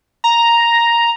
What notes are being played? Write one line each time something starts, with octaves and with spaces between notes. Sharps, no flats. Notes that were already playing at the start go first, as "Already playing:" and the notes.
A#5